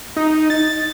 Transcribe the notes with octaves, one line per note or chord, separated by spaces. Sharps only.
D#4
A6